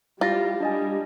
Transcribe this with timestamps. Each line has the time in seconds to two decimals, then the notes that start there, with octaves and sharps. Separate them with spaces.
0.21 G3 E4 F4 G4 A6 A#6
0.60 G3 D4 D#5 G#5